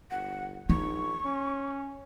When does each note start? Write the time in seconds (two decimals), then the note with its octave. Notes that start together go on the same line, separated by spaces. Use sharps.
0.11 G1 F#5
0.70 A#1 D#4 C#6
1.25 C#4